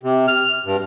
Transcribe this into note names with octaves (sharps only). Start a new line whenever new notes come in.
C3
F6
G2